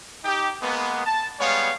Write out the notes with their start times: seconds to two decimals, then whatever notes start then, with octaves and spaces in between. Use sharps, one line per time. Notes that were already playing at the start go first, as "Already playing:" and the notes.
0.24 D#4 G4
0.62 G#3 A#3 B3
1.05 A5
1.39 G3 G#3 B3 C#5 F5